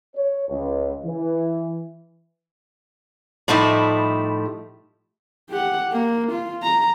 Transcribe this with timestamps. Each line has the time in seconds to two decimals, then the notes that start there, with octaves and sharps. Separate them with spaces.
0.16 C#5
0.49 C#2
1.05 E3
3.48 A2 F3 G3 A3 D#4 E4
5.50 G4 F#5
5.92 A#3
6.32 F4
6.63 A#5